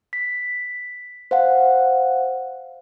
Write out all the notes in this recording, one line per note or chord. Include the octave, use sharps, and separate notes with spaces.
B6
C5 F5 F#5